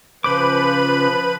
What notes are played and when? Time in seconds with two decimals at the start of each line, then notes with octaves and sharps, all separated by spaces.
0.24 C#3 F3 B4 C5 B5 D6